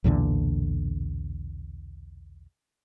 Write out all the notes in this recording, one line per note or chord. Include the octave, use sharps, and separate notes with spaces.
B1 E2 A#2 D3